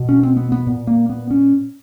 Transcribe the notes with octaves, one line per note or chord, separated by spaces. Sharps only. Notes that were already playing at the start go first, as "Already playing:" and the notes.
Already playing: B2
C#4
C4
B3
B3
A#2
A#3
B3
C#4